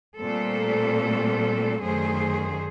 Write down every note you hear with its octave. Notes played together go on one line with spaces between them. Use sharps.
A#2 G3 A3 C4 A4
F#2 D3 D#3 A3 G#4 C5